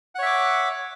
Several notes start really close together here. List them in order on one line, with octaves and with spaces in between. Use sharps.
F#5 C#5 E5 D6